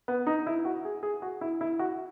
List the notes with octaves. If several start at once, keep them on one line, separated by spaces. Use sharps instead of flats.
B3
D#4
E4
F#4
G#4
G#4
F#4
E4
E4
F#4